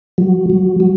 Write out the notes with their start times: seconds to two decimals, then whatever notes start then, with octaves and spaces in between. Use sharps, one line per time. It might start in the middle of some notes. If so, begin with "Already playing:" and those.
0.18 F#3
0.50 F#3
0.80 F#3